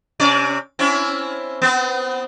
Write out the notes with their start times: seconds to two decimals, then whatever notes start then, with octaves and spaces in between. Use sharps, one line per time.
0.20 C3 C#4 D5
0.79 C4 C#4 E4
1.62 B3 C4